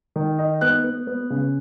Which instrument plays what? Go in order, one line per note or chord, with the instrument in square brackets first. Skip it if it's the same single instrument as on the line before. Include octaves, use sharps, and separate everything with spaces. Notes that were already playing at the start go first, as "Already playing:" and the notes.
[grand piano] D#3
D#4
B3 F#6
B3
B3
C#3